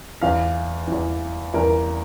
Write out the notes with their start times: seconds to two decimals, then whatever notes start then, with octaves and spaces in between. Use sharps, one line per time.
0.22 E2 E3 F5
0.87 E2 E3
1.54 E2 E3 A#4